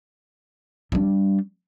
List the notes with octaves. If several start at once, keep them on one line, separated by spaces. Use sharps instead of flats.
G3 D4